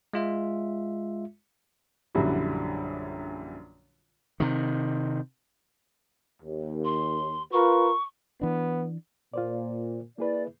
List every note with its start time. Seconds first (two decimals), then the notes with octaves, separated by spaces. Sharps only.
0.13 G#3 F4 E5
2.15 A#1 F#2 D3 G3 E4 F#4
4.40 C3 D#3
6.43 D#2
6.85 C6
7.52 F4 A#4 B4 C#6
8.41 E3 B3 D4
9.34 A#2 F4 C5 D5
10.18 A#3 E4 G#4 B4 D5